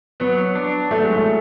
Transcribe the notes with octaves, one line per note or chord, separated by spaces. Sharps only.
F#3 B3
D4
F#3 A3
G#3
A3